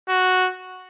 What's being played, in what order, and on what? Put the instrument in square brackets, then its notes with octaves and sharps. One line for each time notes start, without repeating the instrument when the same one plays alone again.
[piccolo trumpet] F#4